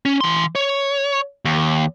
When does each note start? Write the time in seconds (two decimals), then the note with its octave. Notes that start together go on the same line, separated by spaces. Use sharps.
0.06 C#4
0.21 E3 C6
0.55 C#5
1.45 D#2